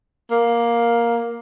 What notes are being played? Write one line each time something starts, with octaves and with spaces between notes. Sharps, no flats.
A#3